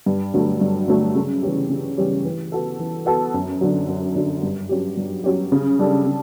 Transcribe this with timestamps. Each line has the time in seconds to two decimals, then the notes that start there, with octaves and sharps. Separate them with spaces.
0.06 G2
0.34 D3 F#3 A3
0.61 G2
0.88 D3 F#3 A3
1.15 C#3
1.43 E3 G3 C#4 G4
1.69 C#3
1.98 E3 G3 C#4 G4
2.25 E3
2.52 B3 F#4 A4
2.79 E3
3.06 B3 F#4 A4
3.34 F#2
3.61 D3 F#3
3.88 F#2
4.16 D3 F#3
4.43 G2
4.69 F#3 C#4 G4
4.97 G2
5.24 F#3 C#4 G4
5.52 C#3
5.79 G3 D4 A4
6.06 C#3